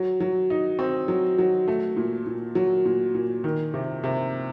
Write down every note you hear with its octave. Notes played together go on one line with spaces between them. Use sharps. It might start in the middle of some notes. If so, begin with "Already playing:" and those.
Already playing: F#3
F#3
D#4
C4
F#3
F#3
A3
A#2
A#2
F#3
A#2
A#2
D#3
C3
C3